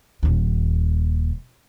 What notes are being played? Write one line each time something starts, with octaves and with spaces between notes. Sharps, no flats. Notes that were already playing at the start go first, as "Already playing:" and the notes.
D#1 D#2